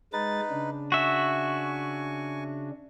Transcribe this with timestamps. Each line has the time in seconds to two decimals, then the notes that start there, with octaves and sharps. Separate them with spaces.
0.13 G#3 D#4 B4 A6
0.51 C#3 D4
0.92 F#4 E5 G#5 C#6